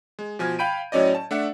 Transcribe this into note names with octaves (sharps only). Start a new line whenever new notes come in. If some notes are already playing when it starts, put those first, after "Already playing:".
G#3
B2 F3 G#5 F6 G#6
F5 G5 B5 G6 D7 D#7
A2 F#3 C#4 D5 D#5
A5
A3 D4 E5 F#5